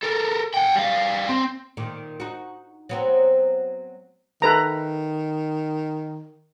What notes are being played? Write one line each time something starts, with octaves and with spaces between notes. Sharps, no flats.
A4 A#4
F#5 G5
G3 F5
C4
A#2 D#3
D#4 F#4
F#3 B3 C4
D#3 A4 B4 A#5